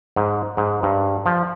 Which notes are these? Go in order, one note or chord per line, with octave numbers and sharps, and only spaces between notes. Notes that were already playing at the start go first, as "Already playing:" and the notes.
G#2
G#2
G2
F3